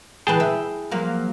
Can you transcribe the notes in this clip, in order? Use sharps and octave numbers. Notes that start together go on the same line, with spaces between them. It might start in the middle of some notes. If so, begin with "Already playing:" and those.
D2 E3 G#4 B4 G5 A5
E5
F3 F#3 A#3